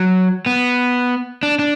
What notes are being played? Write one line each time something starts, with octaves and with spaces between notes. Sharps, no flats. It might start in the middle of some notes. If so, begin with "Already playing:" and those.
Already playing: F#3
B3
D4
D4